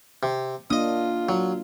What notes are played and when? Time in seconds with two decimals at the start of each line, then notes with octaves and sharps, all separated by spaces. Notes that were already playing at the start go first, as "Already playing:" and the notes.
0.23 C3
0.70 A#3 D4 F4 D#5 D#6
1.29 F#3